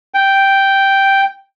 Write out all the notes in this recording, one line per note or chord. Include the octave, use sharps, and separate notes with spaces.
G5